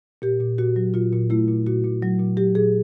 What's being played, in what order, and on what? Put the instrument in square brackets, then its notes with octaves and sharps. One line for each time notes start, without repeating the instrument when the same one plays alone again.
[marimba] A#2 G4
A#2
A#2 F#4
F#3
A#2 F4
A#2
A3 E4
A#2
A#2 F#4
A#2
F#3
A#2
F#3 G4
A#2 G#4